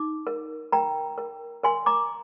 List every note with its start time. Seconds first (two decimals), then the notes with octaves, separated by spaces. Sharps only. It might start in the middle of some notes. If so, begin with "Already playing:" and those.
Already playing: D#4 D6
0.27 A#4
0.72 A#4 G5 A#5
1.18 A#4
1.64 A#4 G#5 C6
1.86 A#5 D6